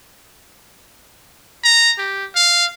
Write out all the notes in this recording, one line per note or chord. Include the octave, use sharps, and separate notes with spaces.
A#5
G4
F5